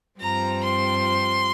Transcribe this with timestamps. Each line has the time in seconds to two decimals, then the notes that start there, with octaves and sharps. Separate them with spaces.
0.19 G2 F3 C4 A#5
0.64 C6